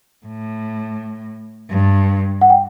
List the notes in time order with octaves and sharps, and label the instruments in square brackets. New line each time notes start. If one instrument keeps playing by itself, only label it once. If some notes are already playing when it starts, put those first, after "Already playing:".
[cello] A2
G2
[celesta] F#5
G5